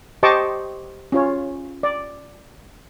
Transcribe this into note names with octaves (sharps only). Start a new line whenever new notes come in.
G4 C5 D#5 A5 C#6 D6
C#4 F4 C#5
D5